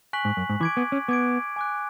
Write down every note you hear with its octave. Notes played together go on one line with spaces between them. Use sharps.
G#5 C#6 F#6 B6 F#7
G#2
F#2
G#2
E3 D6 G#6 D7
B3
C#4
B3 D6 G#6 D7
G#5 D6 F#6